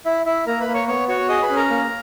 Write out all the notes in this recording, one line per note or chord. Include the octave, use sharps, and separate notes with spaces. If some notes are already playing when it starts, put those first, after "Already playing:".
E4 E5
E4 E5
A#3 A#4 A#5
B4 B5
A#3
C#5 C#6
B3 C#5 C#6
F#4 C#5 C#6
G#4 D#5 D#6
B4 B5
C#4
A#4 A#5
A#3